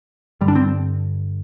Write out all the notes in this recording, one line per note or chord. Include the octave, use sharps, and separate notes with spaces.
G2 D3 G3
D4
C4